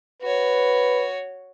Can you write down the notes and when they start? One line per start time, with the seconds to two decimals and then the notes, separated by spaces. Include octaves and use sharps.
0.22 F#4 B4 C#5